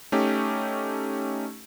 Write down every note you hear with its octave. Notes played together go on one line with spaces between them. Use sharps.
A3 C#4 D#4 G4